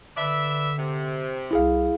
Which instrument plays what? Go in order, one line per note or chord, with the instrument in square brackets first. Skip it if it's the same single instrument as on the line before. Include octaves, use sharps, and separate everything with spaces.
[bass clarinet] D3 [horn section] B4 D5 E5
[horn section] C3
[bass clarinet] C2 [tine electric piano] E4 G#4 F5